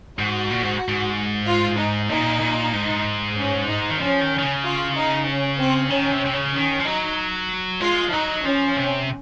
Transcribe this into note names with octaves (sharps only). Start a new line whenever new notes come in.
G#2 F#4
A#2
G#2
G#2
F4
D#4
A#2 D#4
A#2
G#2
C#4
D#4
D#3
F3 C#4
D#3
D#3
C#3
F4
D#4
C#4
C4
D#3 C#4
C3
C3
C#3
D#3 C#4
F3
F#3 D#4
G#3 F4
F3
F#3 D#4
F3 C#4
C3